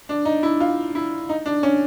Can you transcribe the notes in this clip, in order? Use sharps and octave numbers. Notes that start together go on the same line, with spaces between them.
D4
D#4
E4
F4
E4
D#4
D4
C#4